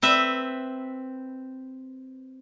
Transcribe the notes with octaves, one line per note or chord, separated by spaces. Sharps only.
C4 B4 E5